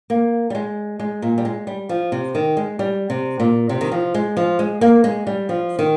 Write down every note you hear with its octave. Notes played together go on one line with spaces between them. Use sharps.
A#3
G3
G#3
G#3
A#2
G3
G#3
G3
F3
C3
D#3
G#3
G3
C3
A#2
C3
D#3
F3
G#3
F3
G#3
A#3
G#3
G3
F3
D#3